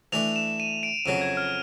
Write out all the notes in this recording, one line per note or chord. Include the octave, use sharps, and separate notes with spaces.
E3 A3 D4 F7
E7
D#7
D7
F2 C#3 F#3 D7
G#6
F6